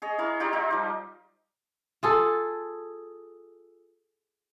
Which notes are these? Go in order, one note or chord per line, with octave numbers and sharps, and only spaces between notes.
G#4 C#5 D#5
E4 A#4 C#5 C6
D#4 F4 G4 D5
D#4 F4 A#4
F3 G3
F4 G#4 A4